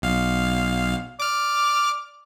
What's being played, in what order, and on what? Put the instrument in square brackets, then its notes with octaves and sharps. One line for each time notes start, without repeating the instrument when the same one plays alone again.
[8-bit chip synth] B1 F5
[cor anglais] D5 [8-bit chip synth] D6 F6